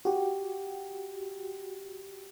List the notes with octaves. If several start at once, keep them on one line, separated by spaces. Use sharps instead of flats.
F#4 G4